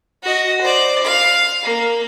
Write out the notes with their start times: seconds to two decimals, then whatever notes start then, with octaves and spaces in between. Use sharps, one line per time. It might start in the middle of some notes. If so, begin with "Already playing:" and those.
0.23 F#4 D#5
0.61 C5 D5
1.04 F5
1.63 A#3